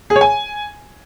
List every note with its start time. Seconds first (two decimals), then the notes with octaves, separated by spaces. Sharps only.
0.10 G#4
0.16 C#5
0.21 G#5